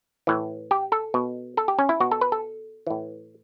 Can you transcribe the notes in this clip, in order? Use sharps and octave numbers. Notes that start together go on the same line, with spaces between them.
A2 E3
G4
A4
B2
A4
G4
C#4
E4
B2 F#4
A4
B4
A4
A2 E3